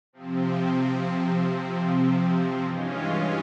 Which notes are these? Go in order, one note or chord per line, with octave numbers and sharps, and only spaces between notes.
C3 F3 C4
G2 E3 G#3 C#4 F4